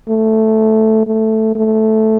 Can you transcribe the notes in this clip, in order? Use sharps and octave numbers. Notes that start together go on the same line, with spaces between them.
A3
A3
A3